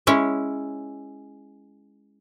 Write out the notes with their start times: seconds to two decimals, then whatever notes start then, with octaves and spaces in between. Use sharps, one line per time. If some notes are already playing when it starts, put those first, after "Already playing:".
0.07 G#3 C#4 E4